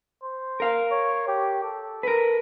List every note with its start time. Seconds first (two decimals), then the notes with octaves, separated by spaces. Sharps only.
0.24 C5
0.60 A#4 F5
0.92 C#5
1.28 G4
1.64 A4
2.03 A#4 B4